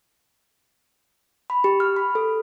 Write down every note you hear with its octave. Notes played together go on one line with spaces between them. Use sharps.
B5
G4
F6
B5
A4